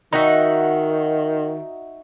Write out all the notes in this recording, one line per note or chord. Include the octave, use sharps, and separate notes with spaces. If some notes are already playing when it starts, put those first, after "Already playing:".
D#3 D#4 F#4 E5